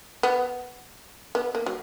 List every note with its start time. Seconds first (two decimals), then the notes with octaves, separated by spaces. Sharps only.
0.23 B3
1.35 B3
1.55 A#3
1.66 F#3